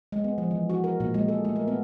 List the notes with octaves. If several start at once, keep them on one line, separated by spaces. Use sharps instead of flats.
G#3
B3
F3
E3
F#4
A#4
A#2
G#3
A4
A3
A#4
B3